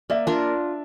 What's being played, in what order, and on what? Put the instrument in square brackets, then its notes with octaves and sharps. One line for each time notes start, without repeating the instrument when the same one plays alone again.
[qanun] A#3 [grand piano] D5 E5
[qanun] D4 F4 A#4